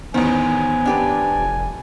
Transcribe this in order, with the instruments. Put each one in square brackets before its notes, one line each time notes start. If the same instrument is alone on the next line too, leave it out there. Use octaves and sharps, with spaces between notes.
[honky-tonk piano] A1 E2 C5 [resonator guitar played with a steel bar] D#3 [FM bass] B3 [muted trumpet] G#5
[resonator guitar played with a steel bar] D4 G4 B4
[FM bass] F1